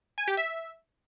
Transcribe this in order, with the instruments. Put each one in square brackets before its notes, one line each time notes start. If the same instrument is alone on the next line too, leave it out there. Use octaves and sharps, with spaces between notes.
[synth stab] G#5
G4
E5